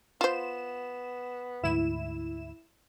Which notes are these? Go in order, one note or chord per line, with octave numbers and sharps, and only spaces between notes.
B3 F4 C5 E7
D2 G#2 E4 E7